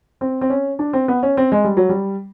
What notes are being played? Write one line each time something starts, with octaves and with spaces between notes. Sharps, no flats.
C4
C4
C#4
D4
C4
B3
C#4
C4
G#3
G3
F#3
G3